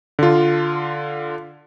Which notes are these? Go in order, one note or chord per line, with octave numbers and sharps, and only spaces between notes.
D3 F4